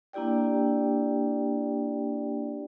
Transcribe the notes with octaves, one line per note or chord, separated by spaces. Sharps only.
A#3 D4 E4 G4 D5 G5